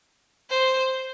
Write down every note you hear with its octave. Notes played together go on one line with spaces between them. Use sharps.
C5